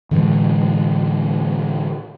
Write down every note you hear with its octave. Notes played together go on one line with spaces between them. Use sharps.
A2 D3 E3 G#3